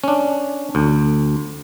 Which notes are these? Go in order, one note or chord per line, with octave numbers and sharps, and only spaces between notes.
C#4 D4
D2